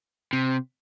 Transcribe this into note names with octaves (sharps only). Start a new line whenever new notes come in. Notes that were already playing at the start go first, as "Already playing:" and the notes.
C3